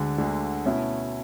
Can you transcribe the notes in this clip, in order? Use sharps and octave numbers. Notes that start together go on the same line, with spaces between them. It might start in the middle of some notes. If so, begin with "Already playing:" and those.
Already playing: D2 D3 G#3
D2 D3 G#3
B2 A3 C#4 E4